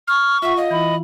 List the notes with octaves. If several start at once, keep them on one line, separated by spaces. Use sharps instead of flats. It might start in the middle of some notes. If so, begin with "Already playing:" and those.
C#6 F6
F4 E5 F#5
D#5 F5
E3 E4 B5